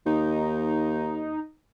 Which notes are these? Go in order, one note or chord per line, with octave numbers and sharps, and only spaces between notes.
D#2 D#4